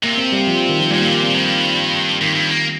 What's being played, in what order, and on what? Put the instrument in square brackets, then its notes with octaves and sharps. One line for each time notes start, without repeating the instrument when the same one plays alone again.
[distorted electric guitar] C3 [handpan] A#3
[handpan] C4
G3
F3
D#3
F3
[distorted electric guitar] A#2 [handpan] G3
[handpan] A#3
A#3
C4
[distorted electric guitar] G2
[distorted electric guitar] G2 [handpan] D#3
[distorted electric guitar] G2
A#3